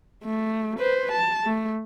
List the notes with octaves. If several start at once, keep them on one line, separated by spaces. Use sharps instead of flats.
A3
B4 C5
A5
A3